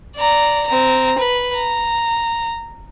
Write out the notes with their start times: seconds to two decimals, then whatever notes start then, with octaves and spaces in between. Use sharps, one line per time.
0.16 D5 A#5
0.67 C4 A#5
1.19 B4
1.55 A#5